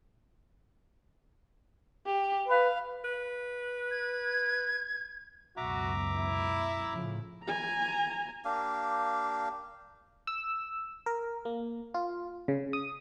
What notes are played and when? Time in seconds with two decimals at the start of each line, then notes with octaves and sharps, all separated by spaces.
2.06 G4
2.48 B4 F5
3.04 B4
3.91 G#6
5.57 C#2 F#2 B2 F#4 E5 A#5 D6
6.15 E4
6.89 A2 C#3 F3
7.44 G#5 A#5
8.45 A#3 D4 G4 F5
10.27 E6
11.06 A#4
11.45 A#3
11.94 F4
12.48 C#3
12.73 D#6